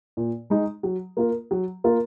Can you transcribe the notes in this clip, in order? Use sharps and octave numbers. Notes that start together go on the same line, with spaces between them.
A#2
G#3 D#4
F#3
A#3 F4 A#4
F#3
A#3 F4 A#4